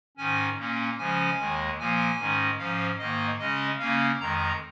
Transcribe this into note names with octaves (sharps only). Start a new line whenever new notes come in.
G#2 D#3 C#4 G#5
A#2 A#3 C#4
C#3 F3 G#3 C#4 G#5
D#2 D#3 G#3
A#2 F3 A#3 G#5
G#2 D#3 G#3 C#4
G#2 F3 C#4 F5
G#2 D#3 A#3 D#5
C#3 G#3 C#4 D#5
C#3 A#3 C#4 F5
F2 D#3 G#3 A#5